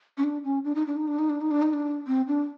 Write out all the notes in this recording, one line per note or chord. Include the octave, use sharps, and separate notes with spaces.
C#4
D4
C#4
D4
D#4
D4
D#4
D4
D#4
D4
D#4
D4
D#4
D4
C4
D4